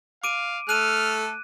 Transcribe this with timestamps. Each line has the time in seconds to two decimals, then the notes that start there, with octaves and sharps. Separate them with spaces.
0.24 F5 D6 D7 D#7
0.69 A3 A4 F6 F#6 D#7